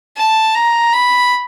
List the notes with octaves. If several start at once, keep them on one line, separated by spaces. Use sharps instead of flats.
A5
A#5
B5